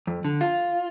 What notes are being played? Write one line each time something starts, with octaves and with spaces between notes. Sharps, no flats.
F2
D3
F4